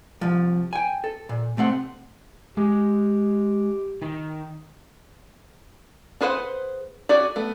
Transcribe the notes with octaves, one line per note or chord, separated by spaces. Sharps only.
C2 F3
G5 G#5
A4
A#2
C3 A3 C4 F#5
G#3 G4
D#3
D4 G#4 B4 C5 F#5
F#4 G#4 D5
A3 B3